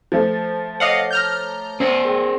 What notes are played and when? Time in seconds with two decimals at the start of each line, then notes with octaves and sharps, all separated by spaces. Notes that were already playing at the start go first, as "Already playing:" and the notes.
0.12 F3 A3
0.80 C#5 D#5 F5 F#5 D6
1.11 A#5 F6 G6
1.80 B3 C#4 C5
2.05 G#4 A#4 G5